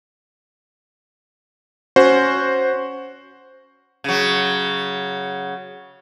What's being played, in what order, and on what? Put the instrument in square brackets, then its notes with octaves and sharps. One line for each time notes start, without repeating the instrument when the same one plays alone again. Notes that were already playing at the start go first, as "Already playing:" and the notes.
[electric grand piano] C#4 F#4 C5
[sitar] C#3 F#3